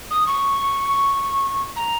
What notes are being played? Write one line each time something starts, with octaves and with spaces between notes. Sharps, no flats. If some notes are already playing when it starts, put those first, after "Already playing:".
D#6
C#6
A#5